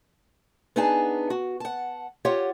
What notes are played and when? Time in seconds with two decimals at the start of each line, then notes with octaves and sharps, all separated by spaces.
0.76 B3 D4 D#4 G#4 G#5 A5
1.30 F#4
1.60 F#5 A5
2.25 F4 G4 C#5 F#5